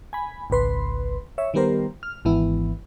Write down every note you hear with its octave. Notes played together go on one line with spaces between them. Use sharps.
G#5 B5
G#1 C#2 B4 C6
C#5 E5
D#3 G3 B3 G4 A#4 C5
F6
G#1 E3 B3 E4